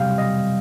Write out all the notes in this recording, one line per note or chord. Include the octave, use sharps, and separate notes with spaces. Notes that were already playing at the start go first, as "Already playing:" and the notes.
Already playing: C3 G3 F5 G5
D#5